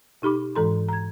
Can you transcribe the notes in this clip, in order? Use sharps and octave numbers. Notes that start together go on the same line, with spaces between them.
B2 D#4 G4 B5 D6
G#2 E3 G#3 A4 A#5 C6
A#5 G#6